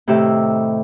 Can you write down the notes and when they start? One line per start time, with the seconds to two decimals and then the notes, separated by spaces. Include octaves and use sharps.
0.07 A2 C3 D#3 G4 E5